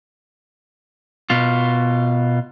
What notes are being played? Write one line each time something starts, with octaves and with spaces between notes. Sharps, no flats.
B2 F4